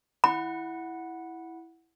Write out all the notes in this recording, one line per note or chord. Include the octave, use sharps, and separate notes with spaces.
E4 F#5 B5